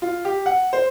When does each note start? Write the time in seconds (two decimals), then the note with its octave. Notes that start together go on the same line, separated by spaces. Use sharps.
0.02 F4
0.25 G4
0.46 F#5
0.73 C5